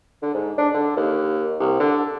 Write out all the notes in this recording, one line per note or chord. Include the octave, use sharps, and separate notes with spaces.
D3
G#2
D4
D3
D#2
C2
D3